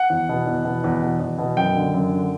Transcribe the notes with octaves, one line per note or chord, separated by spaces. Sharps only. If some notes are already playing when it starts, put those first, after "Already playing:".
Already playing: F#5
E2
B2
E2
B2
E2
B2
E2
B2
F#2 G5
D3
F#2
D3